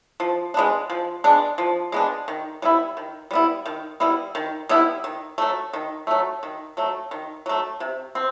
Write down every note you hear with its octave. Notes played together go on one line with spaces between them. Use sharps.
F3
G#3 B3 D4
F3
G#3 B3 D4
F3
G#3 B3 D4
D#3
G3 B3 E4
D#3
G3 B3 E4
D#3
G3 B3 E4
D#3
G3 B3 E4
D#3
F#3 A3
D#3
F#3 A3
D#3
F#3 A3
D#3
F#3 A3
C3
C4